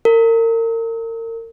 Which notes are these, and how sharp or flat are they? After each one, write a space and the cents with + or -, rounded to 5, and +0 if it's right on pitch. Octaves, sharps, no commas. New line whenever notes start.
A#4 -35